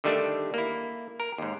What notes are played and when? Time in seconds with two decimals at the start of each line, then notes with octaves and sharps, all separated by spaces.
0.04 D3 D#3 G3 A3 D4
0.54 A#3 E4
1.20 A#4
1.38 D#2 G#2